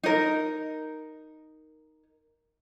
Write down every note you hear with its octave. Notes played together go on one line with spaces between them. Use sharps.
D#4 A#4